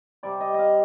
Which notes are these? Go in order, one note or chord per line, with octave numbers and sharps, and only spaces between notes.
C3 G3 C4 D5
D#5
D#5 F5